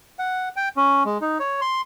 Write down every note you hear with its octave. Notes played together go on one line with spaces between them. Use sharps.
F#5
G5
C#4
G#3
D#4
C#5
C6